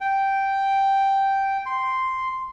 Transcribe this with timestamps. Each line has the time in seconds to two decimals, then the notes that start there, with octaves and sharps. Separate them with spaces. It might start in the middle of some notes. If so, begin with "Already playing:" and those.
0.01 G5
1.66 C6